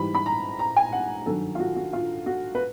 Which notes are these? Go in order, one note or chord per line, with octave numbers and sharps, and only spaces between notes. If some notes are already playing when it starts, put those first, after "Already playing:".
Already playing: G#2 E3 G3 B5
B5
A#5
A#5
G#5
F#5
G2 D#3 F#3 A4
F4
F#4
F#4
F4
F#4
B4